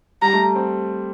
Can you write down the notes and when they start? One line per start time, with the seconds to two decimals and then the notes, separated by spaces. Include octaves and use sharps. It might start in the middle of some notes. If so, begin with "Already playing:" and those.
0.22 G3 A#5
0.33 A3
0.56 C4